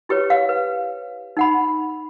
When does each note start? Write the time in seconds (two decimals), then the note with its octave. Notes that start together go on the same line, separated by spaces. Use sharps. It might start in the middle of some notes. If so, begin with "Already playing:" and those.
0.09 E4 G4 B4 C#5
0.30 F5
0.49 B4
1.37 D#4 F#5 B5